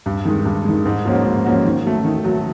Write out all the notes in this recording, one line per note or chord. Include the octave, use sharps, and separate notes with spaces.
G2
D#3 G#3
G2
D#3 G#3
G#2
F3 A#3 C#4 F#4
G#2
F3 A#3 C#4 F#4
D#3
F#3 A3
D#3
F#3 A3